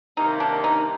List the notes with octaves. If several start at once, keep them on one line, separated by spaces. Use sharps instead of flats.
C3 D#3 G3 A#3 D#4
D4
D#4